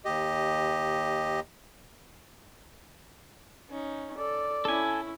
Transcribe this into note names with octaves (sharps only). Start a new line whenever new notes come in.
D#2 G4 D#5
C#4 D#4
A4 D5
C#4 E4 A4 G#5